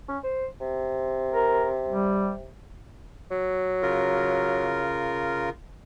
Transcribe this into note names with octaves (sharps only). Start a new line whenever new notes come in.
C#4
C5
C3
A#4
G3
F#3
C#3 F4 A#4